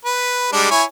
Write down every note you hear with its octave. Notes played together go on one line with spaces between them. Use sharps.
B4
G3 G#3 D4
E4 C#5 G#5